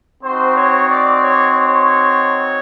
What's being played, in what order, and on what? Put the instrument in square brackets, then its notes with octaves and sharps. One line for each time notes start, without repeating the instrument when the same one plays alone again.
[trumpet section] C4 D#4 F#4 C5
C#5
D5
C#5
C#5